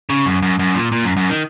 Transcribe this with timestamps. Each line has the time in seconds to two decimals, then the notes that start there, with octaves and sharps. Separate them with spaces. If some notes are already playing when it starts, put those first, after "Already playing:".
0.10 C#3
0.26 F#2
0.42 F#2
0.59 F#2
0.75 A#2
0.92 A#2
1.04 F#2
1.17 F#2
1.29 D#3